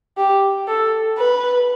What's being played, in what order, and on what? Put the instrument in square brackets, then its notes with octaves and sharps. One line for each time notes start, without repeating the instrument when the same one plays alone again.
[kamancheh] G4
A4
B4